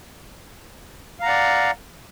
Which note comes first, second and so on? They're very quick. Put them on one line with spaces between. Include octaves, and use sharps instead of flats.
F5 A#5 F#5 D5